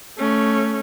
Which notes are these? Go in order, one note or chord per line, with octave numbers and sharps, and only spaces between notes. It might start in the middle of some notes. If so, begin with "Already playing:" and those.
A3 C#4